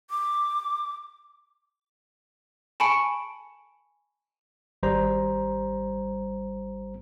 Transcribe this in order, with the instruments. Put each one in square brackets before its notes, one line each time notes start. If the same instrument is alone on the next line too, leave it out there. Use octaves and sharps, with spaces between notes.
[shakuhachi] D6
[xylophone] G#5 A5 B5 C#6 C#7 D7
[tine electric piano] G#1 G3 C5 A#5